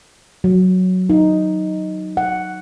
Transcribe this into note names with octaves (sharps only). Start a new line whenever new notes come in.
F#3
D#4
F#5